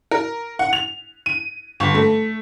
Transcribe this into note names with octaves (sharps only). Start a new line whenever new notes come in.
A#4
F#5
F7
D#7
G1
A3